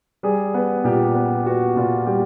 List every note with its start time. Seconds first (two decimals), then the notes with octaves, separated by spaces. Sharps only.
0.23 G3 G#4
0.54 B3
0.84 A#2 G4
1.15 B3
1.46 B3 F#4
1.76 A#2 F4
2.07 G3 G4